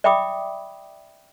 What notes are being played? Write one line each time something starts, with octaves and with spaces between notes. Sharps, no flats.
D5 E5 G5 B5 D6 D#6